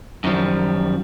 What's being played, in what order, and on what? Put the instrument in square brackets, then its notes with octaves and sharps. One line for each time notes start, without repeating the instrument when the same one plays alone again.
[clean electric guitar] F#2 D#3 F3 G3